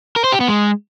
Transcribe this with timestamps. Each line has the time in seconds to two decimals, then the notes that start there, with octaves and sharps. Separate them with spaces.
0.16 A#4
0.24 C5
0.32 G4
0.40 B3
0.48 G#3